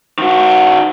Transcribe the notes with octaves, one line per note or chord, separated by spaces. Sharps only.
D#3 F#4